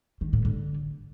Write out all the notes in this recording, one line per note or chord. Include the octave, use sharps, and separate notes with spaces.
D#3
A2
D3